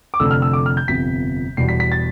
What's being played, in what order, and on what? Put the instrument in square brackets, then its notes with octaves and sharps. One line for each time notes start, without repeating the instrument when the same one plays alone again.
[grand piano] D6
F1 F2 D3 A3 E6
F6
E6
D6
F6
G6
G1 F2 C3 F3 B3 B6
E1 E2 B2 G3 B3 C7
B6
B6
A6